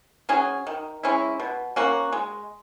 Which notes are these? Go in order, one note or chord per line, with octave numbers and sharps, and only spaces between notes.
F#3 C#4 G#4
D#3
G#3 C#4 E4
B2
A#3 C#4 F#4
G#3